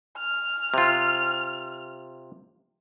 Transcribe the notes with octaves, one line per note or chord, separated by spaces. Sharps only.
F6
C3 F4